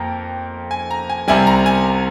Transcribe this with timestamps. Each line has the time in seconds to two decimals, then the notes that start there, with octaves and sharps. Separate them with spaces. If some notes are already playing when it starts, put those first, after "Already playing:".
Already playing: F2 A#3 G5 A#5
0.71 G#5
0.91 A#5
1.09 G#5
1.28 C2 C3 G3 G#5
1.47 A#5
1.66 G#5